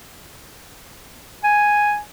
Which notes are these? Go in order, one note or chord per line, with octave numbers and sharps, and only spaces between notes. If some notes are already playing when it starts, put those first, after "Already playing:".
G#5